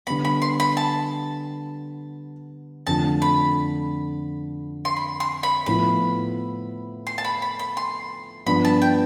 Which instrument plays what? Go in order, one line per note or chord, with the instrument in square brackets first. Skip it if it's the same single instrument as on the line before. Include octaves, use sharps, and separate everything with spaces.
[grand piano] D3 G3 B3 [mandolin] B5
[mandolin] B5
C6
B5
A5
[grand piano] F2 D3 F3 A3 [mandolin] A5
[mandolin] B5
C6
B5
C6
B5
[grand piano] A2 F3 B3 E4 [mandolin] B5
[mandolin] C6
A5
B5
B5
B5
C6
[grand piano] G2 F3 B3 D4 [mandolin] B5
[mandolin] A5
G5